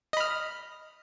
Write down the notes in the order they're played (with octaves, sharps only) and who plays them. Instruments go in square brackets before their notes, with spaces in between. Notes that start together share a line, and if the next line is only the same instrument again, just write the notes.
[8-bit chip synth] D#5
B5
F6